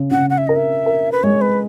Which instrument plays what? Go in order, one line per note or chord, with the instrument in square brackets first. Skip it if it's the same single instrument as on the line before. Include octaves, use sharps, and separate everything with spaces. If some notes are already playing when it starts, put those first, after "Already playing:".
Already playing: [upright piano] C#3
[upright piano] C#3 [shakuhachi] F#5
[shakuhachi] F#5
E5
[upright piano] A#4 [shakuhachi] D#5
[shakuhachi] E5
[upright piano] A#4
[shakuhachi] B4
[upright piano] G#3 [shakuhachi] C#5
[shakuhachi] B4